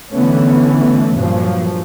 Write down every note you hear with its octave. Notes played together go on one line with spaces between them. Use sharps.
D3 E3 A3 B3 C#4
G2 A#2 F3 F#3